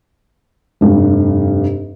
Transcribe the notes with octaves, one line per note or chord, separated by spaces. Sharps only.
F1 G2